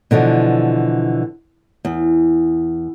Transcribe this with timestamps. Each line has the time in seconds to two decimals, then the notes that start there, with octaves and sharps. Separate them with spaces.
0.11 B2 D3 E3 F3
1.85 E2